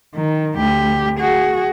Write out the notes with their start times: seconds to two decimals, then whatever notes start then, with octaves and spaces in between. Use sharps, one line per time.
0.15 D#3
0.57 D2 G4
1.19 F#4 G#4